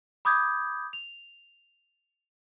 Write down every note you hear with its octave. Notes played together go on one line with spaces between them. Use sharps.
B5 D6 D#6 G6 G#6
F7